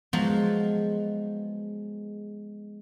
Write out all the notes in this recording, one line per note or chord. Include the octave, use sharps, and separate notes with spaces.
F3 F#3 G#3 B3